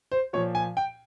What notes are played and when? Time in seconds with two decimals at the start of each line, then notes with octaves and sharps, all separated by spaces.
0.12 C5
0.33 A#2 F3 C#5
0.55 G#5
0.77 G5